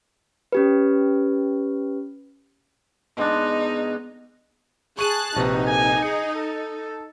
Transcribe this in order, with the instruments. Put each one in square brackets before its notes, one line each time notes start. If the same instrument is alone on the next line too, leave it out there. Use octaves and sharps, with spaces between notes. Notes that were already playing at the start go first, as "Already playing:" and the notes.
[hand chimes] C#4 G4 B4
[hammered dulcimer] B2 G#3 D4 [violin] D#4
[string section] G#4 A5 F#6 [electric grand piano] C#6 D#7
[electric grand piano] A#1 C3 B4 [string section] D#4 [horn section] F#4
[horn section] A#3 A4 G#5
[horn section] G#4 [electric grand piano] C#7
[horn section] A4